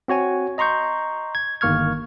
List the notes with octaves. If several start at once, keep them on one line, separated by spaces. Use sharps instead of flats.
C4 F#4 C#5 G#5
D#5 A#5 C6 C#6 G6
G#6
G1 D#3 A#3 C#6 F6 G#6